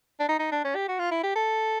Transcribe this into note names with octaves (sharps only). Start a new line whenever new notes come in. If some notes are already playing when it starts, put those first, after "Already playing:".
D4
D#4
D#4
D4
C#4
G4
F#4
F4
E4
G4
A4